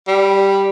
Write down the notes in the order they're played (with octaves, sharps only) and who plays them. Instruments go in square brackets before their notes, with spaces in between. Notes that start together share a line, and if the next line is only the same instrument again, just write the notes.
[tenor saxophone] G3